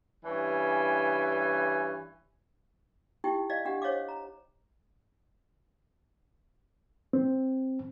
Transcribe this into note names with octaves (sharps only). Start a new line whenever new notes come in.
G2 E3 C#4 G#5
D#4 E4 G4 G5
D5 D#5 F5
D4 G4 F#5
C5 C#5 D#5 F5 D6
A#5
C4